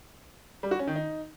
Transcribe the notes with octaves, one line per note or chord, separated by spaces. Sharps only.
G3
F#4
C#4
D#3
D#4